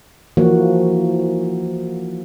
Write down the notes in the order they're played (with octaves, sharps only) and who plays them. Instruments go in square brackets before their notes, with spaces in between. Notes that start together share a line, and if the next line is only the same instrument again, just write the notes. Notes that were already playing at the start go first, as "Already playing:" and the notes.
[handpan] E3 F3 A#3 F#4